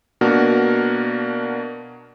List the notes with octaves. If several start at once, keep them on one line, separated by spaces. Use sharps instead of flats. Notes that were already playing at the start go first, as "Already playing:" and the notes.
B2 A#3 D4 F#4 A#4